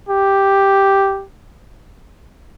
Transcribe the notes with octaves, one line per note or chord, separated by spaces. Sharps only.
G4